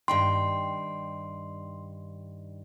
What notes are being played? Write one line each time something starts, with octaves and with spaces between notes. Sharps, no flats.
G2 D#3 G5 C6